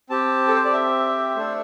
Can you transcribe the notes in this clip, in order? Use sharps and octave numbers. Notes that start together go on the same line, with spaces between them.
C4 G4 A5
A4
C5
D5
E5
A3 D4 A4 C5